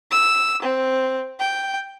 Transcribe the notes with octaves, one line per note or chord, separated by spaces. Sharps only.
E6
C4
G5